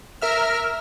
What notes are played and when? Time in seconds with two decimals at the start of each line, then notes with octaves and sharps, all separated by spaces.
0.22 A#4 E5 F6